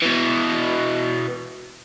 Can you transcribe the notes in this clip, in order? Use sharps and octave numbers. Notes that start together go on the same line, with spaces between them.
B2 E3